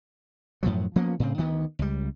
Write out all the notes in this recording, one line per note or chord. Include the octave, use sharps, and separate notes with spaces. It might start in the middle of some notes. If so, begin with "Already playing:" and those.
F#2 A2 F3 F#3
F3 A#3 B3 C#4
A2 C#3 C4
D2 D#3 B3
C#2 G3